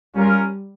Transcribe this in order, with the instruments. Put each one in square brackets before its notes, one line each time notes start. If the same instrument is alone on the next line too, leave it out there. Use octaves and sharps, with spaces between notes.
[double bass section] G3 [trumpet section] C#4 F4 A#4